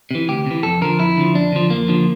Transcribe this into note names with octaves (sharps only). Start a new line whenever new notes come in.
C3 E3
D2 G4
C3 E3
F2 A4
D3 F3 A#4
F2 E4
D3 F3
F2 D4
D3 F3
F2 A#3
D3 F3